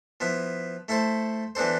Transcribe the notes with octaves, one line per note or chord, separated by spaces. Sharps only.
F3 B3 E4
A3 E4 A4 C5
E3 B3 D4 A4 C5